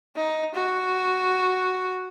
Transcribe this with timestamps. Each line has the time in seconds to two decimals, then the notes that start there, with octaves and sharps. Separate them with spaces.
0.16 D#4
0.55 F#4